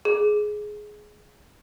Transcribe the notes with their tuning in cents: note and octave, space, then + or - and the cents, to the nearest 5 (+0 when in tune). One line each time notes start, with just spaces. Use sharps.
G#4 +10